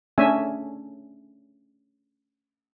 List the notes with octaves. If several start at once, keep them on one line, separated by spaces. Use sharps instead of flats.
A3 C#4 D4 E5 G#5